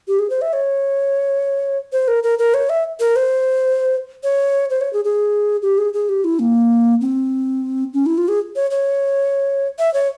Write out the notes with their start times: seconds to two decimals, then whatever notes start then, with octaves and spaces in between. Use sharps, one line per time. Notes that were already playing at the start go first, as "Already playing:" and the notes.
0.08 G4
0.19 G#4
0.30 C5
0.42 E5
0.53 C#5
1.93 C5
2.08 A#4
2.23 A#4
2.39 A#4
2.54 C#5
2.70 E5
3.00 A#4
3.16 C5
4.24 C#5
4.70 C5
4.81 C#5
4.93 G#4
5.05 G#4
5.62 G4
5.78 G#4
5.93 G#4
6.09 G4
6.24 E4
6.39 A#3
7.01 C4
7.94 C#4
8.06 E4
8.18 F4
8.28 G#4
8.56 C#5
8.71 C#5
9.79 E5
9.94 C#5